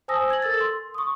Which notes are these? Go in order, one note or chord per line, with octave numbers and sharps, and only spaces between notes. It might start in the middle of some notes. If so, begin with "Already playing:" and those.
C5 G#5 A5 D#6 E6 A#6
G#6 F#7
A4 A#4 E6 A6
C6
C#6 D#6